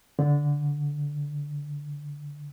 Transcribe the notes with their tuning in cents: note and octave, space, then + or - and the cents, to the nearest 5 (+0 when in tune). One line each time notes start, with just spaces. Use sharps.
D3 -10